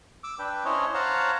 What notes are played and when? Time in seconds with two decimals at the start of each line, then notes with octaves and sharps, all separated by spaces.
0.24 D6 E6
0.39 D4 B4 G5
0.65 C#4 D4 E4 C5 C#5 D#5
0.94 C5 C#5 F5 F#5 A5 A#5